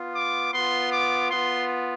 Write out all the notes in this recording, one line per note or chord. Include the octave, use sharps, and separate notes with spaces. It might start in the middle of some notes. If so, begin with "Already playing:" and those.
Already playing: B3 F4
D6
B3 F4 C6
D6
B3 F4 C6